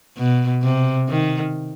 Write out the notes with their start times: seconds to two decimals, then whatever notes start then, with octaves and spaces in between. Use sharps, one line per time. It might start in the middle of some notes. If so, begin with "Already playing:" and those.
0.17 B2
0.63 C3
1.09 D#3